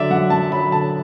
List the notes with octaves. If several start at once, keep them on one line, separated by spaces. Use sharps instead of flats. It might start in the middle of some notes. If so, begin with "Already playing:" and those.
Already playing: D3 F#3 D5 E5
F#2 F#5
F#2 A5
F#3 B5
D3 A5